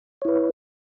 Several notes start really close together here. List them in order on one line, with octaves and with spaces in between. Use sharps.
C#5 E4 B4